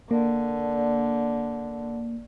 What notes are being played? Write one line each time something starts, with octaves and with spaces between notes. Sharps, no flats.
D3 A#3